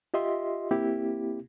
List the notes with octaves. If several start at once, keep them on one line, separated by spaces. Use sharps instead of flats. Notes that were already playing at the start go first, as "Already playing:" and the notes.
F4 G4 D#5 E5 C6
A#3 C4 E4 G4